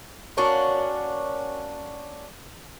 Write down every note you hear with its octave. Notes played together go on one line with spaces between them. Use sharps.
A#3 C#4 D4 F#4